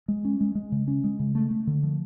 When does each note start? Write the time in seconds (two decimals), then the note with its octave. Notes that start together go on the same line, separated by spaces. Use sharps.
0.08 G#3
0.25 C#4
0.41 G#3
0.55 G#3
0.72 C#3
0.88 C#4
1.04 G#3
1.19 C#3
1.35 A3
1.51 A3
1.67 D3
1.83 F3